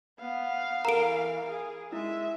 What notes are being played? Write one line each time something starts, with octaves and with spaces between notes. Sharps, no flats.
B3 F5
E3 A4 A#4 A#5 D7
G#4
G#3 E4 E5